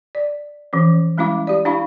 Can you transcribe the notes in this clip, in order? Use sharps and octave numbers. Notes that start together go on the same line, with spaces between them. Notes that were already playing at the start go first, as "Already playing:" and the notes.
D5
E3 F3 C#4
G3 G#3 C#4 E4 F5 D6
G4 D5
D4 E4 G4 F5 B5 C#6